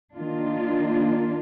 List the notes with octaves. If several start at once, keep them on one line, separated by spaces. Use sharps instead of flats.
D#3 A#3 D4 F4